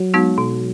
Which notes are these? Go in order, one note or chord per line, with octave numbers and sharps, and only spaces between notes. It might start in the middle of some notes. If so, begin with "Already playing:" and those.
Already playing: F#3
G#3 B3 D#4 F#4
B2